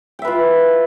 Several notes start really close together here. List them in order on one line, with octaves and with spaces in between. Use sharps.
G5 E5 B4 F4